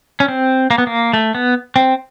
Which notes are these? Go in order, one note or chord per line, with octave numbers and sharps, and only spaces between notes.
C#4
C4
A#3
B3
A#3
A3
B3
C4